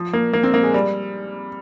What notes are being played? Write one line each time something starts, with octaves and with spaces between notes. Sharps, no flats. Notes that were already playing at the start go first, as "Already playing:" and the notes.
Already playing: F3
A#3
A#3
C4
A#3
G#3
G3